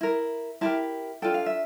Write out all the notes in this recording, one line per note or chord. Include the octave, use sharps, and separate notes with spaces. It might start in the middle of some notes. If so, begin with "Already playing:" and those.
E4 A#4
E4 G4 A#4 A5
D4 F4 A4 G5
F5
E5